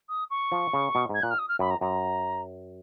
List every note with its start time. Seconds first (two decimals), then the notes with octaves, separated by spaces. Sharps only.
0.09 D#6
0.30 C#6
0.52 F3
0.73 C#3
0.95 B2
1.09 G#2 G#6
1.22 A#2 F#6
1.31 F6
1.39 D#6
1.49 F6
1.59 F#2 B5
1.70 A#5
1.81 F#2 A#5